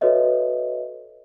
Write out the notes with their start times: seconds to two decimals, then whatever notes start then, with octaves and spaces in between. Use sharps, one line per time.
0.01 F#4 A4 B4 C#5 D#5 E5